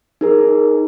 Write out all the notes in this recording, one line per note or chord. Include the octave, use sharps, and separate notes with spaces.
D#4 G#4 A#4